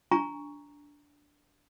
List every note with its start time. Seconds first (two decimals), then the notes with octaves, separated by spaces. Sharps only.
0.11 D4 G#5 A#5 C#6